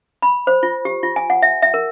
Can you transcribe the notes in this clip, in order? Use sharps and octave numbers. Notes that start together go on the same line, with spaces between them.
B5
C5
F4
G4
F4
G#5
F#5
E5
E5
A#4